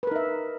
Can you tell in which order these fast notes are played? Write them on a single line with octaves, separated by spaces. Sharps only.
B4 A#4 D#4 E5